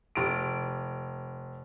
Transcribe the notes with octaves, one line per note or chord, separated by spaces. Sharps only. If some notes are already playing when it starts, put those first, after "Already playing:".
F1 D7